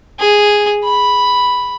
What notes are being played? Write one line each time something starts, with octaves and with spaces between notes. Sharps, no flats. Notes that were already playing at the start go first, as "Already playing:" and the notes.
G#4
B5